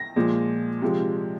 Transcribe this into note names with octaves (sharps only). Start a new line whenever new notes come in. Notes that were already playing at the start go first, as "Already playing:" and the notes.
Already playing: A#6
A#2 F3 G#3
C3 F3 G#3